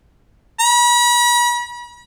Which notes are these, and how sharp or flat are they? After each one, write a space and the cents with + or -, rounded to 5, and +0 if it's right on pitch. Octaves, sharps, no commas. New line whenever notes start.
B5 -40